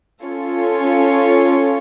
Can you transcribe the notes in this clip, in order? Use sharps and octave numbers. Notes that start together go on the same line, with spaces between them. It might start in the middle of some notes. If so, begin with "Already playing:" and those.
C#4 F4 A4 C#5